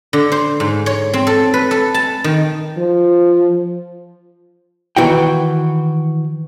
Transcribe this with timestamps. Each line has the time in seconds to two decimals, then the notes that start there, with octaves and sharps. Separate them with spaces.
0.13 D3
0.32 C5
0.60 G#2
0.86 C#5
1.14 C4
1.27 A4
1.54 B4
1.71 A4
1.94 A5
2.24 D#3
2.77 F3
4.97 D#3 E3 F#4 G5